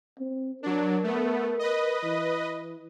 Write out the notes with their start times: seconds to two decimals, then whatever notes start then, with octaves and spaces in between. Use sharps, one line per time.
0.19 C4
0.63 F#3 D4 A#4
1.04 A3 B3
1.59 B4 D#5
2.03 E3